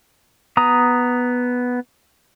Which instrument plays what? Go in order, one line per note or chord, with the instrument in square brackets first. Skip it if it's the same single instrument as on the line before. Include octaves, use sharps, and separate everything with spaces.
[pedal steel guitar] B3 A#5 D#6